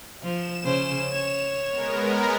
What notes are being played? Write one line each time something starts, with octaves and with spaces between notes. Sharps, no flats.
F3 E7
C#3 C#4 C5
C#5
G#3 B3 A#4